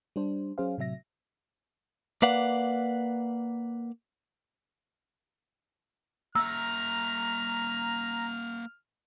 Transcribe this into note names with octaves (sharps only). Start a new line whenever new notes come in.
G3 D4 C5
F#3 C#4 G#4 C5 F5
A2 C3 F#3 E5 A#6
A#3 B4 D5 F5 F#5
A#3 E5 A#5 E6 F6